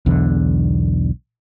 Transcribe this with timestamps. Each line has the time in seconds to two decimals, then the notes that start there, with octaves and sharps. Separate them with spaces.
0.06 B1 E2 D3